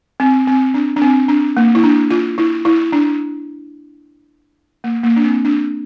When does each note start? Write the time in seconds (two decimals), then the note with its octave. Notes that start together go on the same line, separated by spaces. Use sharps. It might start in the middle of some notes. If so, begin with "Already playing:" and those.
0.20 C4
0.47 C4
0.74 D4
0.96 D4
1.01 C4
1.28 D4
1.57 A#3
1.75 E4
1.84 D4
2.11 F4
2.38 E4
2.65 E4
2.92 D4
4.84 A#3
5.04 A#3
5.16 D4
5.25 C4
5.45 D4